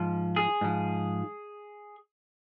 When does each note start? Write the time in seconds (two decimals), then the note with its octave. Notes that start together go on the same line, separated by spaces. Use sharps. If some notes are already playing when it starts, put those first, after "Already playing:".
Already playing: G#2 F3
0.36 G#4
0.61 G#2 F3